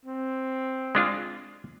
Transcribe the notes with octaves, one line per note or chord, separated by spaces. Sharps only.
C4
G#3 D4 F4